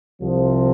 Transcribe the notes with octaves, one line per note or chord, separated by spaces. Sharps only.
C2 C3 F3 C4